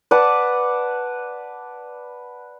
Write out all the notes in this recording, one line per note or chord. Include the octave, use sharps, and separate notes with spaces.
B4 D5 F#5 A5